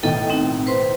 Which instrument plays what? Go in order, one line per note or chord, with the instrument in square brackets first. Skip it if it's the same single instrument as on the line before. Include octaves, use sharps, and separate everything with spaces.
[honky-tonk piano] B1 A2 D#3 [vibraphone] A4 D#5 G5
[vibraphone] C4 D#4
B4 C5 C6